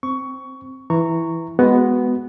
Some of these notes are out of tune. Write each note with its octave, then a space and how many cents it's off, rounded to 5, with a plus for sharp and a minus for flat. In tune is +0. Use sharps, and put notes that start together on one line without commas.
C4 +0 C#6 +15
E3 +0 A#5 -20 C#6 +0
G#3 +0 B3 +0 F#4 +15